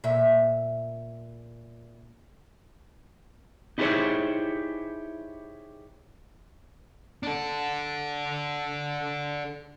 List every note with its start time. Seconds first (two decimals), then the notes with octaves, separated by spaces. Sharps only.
0.04 A#2 E5
3.78 D#4 E4 G4 G#4 C5 C#5
7.23 D4 A4